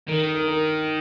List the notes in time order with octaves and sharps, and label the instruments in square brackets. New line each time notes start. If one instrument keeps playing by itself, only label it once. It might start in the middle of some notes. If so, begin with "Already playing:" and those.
[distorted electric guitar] D#3 [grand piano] A#4
[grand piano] A#4
A#4
A#4